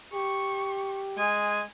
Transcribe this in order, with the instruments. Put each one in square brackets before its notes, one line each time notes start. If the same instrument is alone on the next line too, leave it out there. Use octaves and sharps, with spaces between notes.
[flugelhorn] G4 [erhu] C#6
[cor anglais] G#3 [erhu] G#5